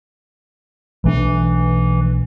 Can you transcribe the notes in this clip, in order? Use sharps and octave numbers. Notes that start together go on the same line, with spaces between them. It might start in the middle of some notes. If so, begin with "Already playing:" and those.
B1 E3 A3 D4